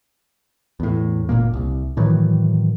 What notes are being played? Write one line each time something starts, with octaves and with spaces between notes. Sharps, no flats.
E2 A2
F#1 A#2 A#3
C2
A2 D#3 E3 F#3